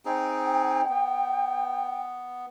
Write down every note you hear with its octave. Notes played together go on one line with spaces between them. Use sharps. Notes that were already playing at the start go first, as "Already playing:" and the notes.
C4 D#4 G#4 G5
B3